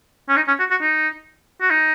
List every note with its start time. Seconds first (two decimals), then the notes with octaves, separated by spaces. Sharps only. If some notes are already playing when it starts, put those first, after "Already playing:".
0.29 C#4
0.37 D#4
0.48 C#4
0.59 F#4
0.71 F#4
0.82 D#4
1.61 F#4
1.71 D#4